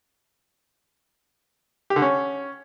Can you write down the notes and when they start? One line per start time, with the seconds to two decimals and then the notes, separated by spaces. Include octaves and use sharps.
1.90 G4
1.96 D3
2.02 C#4